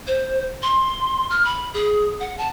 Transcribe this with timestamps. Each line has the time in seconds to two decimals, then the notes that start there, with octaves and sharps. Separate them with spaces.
0.07 C5
0.63 C6
1.30 F6
1.45 B5
1.74 G#4
2.20 F#5
2.38 A5